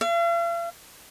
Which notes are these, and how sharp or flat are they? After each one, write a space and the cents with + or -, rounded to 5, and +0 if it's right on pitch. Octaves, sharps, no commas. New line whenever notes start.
F5 -45